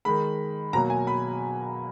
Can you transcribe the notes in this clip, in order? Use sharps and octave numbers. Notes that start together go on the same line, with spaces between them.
D#3 G#3 B5
B2 F#3 A#3 A#5
G#5
B5